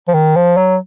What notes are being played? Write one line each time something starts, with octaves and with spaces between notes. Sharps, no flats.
F3
D#3
F3
F#3